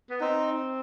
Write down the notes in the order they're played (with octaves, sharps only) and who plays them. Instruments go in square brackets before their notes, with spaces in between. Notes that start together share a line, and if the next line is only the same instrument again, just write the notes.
[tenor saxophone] B3
[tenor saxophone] C4 [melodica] D#4